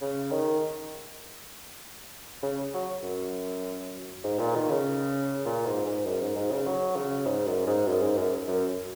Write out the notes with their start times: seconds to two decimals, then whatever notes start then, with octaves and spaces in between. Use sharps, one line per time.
0.01 C#3
0.31 D#3
2.43 C#3
2.74 F#3
3.03 F#2
4.24 G#2
4.39 A#2
4.55 D#3
4.70 C#3
5.46 A#2
5.66 G#2
5.85 G#2
6.06 F#2
6.21 G#2
6.36 G#2
6.51 C#3
6.67 F#3
6.96 C#3
7.26 G#2
7.47 F#2
7.67 G#2
7.87 F#2
8.02 G#2
8.17 F#2
8.48 F#2